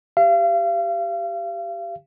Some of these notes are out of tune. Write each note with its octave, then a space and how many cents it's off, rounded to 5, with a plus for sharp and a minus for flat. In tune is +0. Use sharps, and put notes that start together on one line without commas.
G4 +0 F5 -35